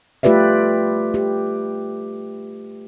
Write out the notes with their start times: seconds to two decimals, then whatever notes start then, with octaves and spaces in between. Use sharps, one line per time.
0.23 A3 F4 G4 B4 D5 E5
1.14 G4